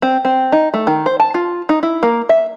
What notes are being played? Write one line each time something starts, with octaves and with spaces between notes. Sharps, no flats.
C4
C4
D#4
A3
D#3
C5
A5
F4
D#4
E4
A#3
E5